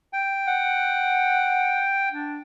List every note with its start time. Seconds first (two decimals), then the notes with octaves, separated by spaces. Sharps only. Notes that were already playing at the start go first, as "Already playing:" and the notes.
0.13 G5
0.47 F#5
2.11 D4